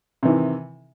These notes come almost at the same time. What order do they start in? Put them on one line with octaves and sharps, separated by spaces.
C3 E3 D#3